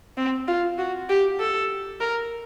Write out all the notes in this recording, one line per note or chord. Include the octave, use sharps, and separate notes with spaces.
C4
F4
F#4
G4
A4
A#4